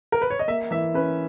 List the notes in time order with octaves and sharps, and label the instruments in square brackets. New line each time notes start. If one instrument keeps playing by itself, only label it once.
[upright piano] A#4
B4
C#5
D#5
A#3 E5
E3 E5
C#4 B4